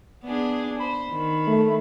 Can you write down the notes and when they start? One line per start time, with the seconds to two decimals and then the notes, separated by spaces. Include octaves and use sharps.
0.23 B3 D4 G#4
0.80 C5 B5
1.09 D#3
1.47 A3